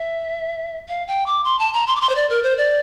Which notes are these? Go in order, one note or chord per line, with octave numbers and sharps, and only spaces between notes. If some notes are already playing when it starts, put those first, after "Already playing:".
Already playing: E5
F5
G5
D6
C6
A5
A#5
C6
D6
C6
C5
D5
A#4
C5
D5